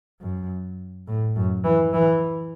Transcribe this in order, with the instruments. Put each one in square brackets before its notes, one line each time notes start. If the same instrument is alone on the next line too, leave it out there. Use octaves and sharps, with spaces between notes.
[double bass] F#2
A2
F#2
E3
E3